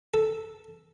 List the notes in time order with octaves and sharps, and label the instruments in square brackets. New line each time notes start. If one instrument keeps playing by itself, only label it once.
[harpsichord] A4